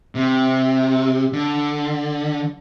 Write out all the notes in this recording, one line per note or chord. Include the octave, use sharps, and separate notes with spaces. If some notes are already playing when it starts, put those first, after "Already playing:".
C3
D3